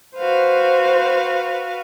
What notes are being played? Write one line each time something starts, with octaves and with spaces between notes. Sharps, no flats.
F#4 B4 C5 F5